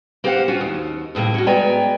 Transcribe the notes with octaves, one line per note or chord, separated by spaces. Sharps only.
A#3 G4 C5 D#5 F5 F#5
C#4 F4 F#4
D#2
D#2 A2 C3 A#3
C#4 F#4
G#3 B3 D5 G5 G#5 A#5